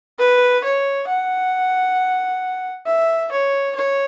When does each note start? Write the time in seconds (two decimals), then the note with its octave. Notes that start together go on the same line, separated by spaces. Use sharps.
0.19 B4
0.64 C#5
1.08 F#5
2.86 E5
3.32 C#5
3.75 C#5